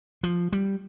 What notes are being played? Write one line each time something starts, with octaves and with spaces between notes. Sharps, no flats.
F3
G3